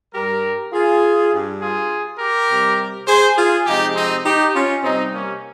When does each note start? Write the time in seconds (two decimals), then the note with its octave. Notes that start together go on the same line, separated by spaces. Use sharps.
0.13 G2 G3 G4 A#4
0.72 F4 G#4
1.32 G2 G3
1.60 F4 G#4
2.19 G4 A#4
2.49 C3 G3
3.07 G#4 C5
3.37 F4 G#4
3.66 C3 F3 G#3 D#4 G4
3.95 C4 D#4
4.25 D#4 G4
4.54 C#4 F4
4.84 C3 G3 C4 D#4
5.13 A#3 C#4